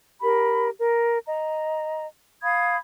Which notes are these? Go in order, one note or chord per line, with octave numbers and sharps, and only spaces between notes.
G4 A#4 B5
A#4
D#5 A#5
F5 B5 D#6 G#6